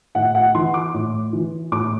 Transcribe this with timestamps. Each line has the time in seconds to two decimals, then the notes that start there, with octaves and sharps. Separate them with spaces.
0.15 A2 F#5
0.35 F#5
0.55 E3 C6
0.74 D6
0.94 A2
1.33 E3
1.72 A2 D6